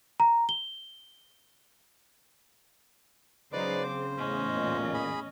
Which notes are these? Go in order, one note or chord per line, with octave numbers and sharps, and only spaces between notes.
A#5
G7
C#3 F#3 D#4 B4 C5 D5 D6
C4 C5
E2 A2 C#4 D#5
C#2 F#2 A#2
G#4 B5